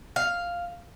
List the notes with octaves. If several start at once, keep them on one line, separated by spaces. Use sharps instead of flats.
F5